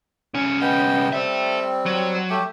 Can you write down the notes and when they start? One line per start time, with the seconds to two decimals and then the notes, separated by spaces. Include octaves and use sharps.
0.34 C2 C#4
0.61 B3 D#5 G5
1.13 G3 C4 A4 E5
1.86 F#3
2.30 A3 G4